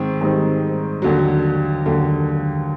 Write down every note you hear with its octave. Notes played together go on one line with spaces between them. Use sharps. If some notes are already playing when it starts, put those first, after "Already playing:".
Already playing: G#2 D#3 C4
G#2 D#3 G3 C4 D#4
D#2 D3 F#3
D#2 D3 F#3